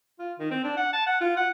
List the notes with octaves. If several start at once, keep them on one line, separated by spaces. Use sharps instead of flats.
F4
D#3
C4
D4
F#5
A5
F#5
F4
F#5